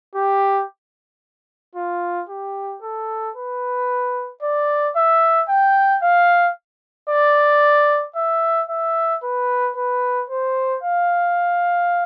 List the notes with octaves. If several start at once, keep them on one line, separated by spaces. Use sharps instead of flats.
G4
F4
G4
A4
B4
D5
E5
G5
F5
D5
E5
E5
B4
B4
C5
F5